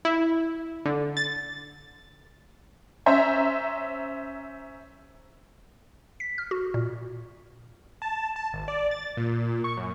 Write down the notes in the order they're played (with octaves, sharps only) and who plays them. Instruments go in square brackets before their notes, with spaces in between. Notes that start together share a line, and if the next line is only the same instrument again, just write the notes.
[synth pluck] E4
D3
A6
[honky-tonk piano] C#4 C5 E5 A#5
[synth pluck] B6
F6
F#4
A#2
[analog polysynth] A5
A5
G#1
D5
A6
A#2
C#6
F#2